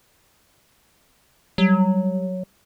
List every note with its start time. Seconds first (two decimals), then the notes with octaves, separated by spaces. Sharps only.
1.58 F#3 G3